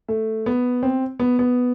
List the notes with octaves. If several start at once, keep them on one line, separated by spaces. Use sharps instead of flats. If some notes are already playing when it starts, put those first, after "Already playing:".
A3
B3
C4
B3
B3